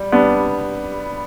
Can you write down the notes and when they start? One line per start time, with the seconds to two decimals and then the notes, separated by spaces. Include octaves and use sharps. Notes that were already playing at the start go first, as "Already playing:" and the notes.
Already playing: G3
0.12 G3 B3 D4